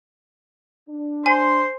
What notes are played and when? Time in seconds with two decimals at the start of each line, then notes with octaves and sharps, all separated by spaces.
0.89 D4
1.26 C5 G#5 C6